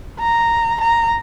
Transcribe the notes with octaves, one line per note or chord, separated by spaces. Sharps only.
A#5
A#5